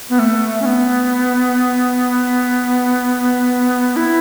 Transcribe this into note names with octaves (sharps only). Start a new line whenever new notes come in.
B3
A3
C#4
B3
E4